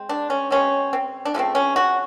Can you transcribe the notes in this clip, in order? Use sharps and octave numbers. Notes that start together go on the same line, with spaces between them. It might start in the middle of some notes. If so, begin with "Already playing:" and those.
Already playing: G#3 C4
D4
C#4
B2 G#3 C4 C#4
C4
D4
C#3 F3 A3 C4 C#4
C#4
F#4